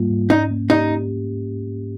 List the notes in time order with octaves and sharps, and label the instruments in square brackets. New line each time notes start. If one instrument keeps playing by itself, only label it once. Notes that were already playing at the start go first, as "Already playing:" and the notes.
Already playing: [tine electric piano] G#2 G3 A#3 F4
G#2
[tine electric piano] C#4 [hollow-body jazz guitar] D#4
[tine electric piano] A#3
[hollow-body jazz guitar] D#4 [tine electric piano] G4